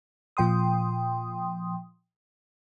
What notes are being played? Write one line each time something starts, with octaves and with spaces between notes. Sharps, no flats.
A#2 F3 G5 C6 D#6